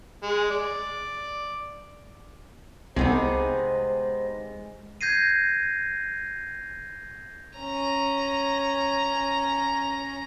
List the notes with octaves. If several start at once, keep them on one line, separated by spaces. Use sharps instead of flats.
G#3
D5
C2 C3 G#3 B3 D#4 G#4 C5
G6 G#6 A#6 C7 D#7
C#4 A#5